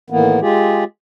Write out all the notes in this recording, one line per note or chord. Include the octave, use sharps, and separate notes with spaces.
A2 D#3 E3 A#3 B3
G#3 F4 G4 G#4